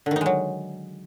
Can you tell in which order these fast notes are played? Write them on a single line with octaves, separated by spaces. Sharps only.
D3 D#3 D#4 G#3 F#3